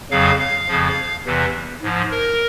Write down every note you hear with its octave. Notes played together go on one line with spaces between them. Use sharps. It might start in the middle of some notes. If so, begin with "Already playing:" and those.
F2 C#3 F#3 F5
F5
F2 C#3 F3
E2 C3 E3
G#2 F3
A#4